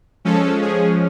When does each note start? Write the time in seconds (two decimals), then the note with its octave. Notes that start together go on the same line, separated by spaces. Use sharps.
0.25 F3 G#3 C#4 A4
0.62 G#4